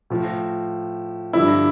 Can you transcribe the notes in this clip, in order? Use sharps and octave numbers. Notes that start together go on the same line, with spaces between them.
A2 F3
G2 D3 F3 E4